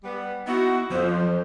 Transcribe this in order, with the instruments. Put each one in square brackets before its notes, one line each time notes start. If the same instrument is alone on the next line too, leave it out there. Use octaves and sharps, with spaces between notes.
[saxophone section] G3 B3
[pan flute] B3 [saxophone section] D#4 E4 F#4
[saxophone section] F2 [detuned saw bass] F3 [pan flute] C5